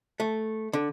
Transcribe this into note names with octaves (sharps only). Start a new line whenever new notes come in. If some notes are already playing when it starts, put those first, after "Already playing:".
A3
D3